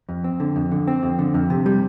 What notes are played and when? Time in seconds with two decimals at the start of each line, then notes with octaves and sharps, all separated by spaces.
0.09 F2
0.24 C4
0.40 D3
0.56 F2
0.72 D3
0.88 C4
1.03 F2
1.19 D3
1.34 F2
1.50 C3
1.66 G3